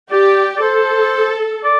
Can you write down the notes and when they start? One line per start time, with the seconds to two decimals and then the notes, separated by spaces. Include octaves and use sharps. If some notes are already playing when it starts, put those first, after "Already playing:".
0.11 G4 D5
0.56 D5
0.62 A4 C5
1.64 D5